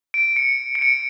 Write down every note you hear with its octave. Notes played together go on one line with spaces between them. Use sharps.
D7
C#7
C#7
D7